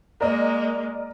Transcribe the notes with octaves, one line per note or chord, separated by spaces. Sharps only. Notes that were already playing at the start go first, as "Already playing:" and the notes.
G#3 A#3 A#4 D5 D#5